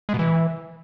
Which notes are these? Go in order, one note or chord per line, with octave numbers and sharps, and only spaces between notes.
G#3
B2
E3